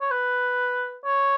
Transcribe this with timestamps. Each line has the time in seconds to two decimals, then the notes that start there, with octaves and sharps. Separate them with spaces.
0.01 C#5
0.11 B4
1.05 C#5